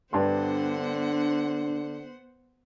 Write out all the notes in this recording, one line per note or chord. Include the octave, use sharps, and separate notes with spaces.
G2 D3 B3 D4 C5 F#5 C6